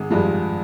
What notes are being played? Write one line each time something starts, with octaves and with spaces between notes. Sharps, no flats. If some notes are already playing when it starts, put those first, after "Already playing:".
Already playing: G#1 G#3
G2 F3 G#3